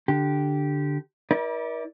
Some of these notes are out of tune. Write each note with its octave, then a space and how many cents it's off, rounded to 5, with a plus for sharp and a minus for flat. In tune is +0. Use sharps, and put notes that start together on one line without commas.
D3 +0 G4 -10
E4 -40 A#4 +45 D5 +0